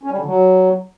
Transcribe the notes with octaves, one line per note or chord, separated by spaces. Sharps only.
C#4
G3
D3
F#3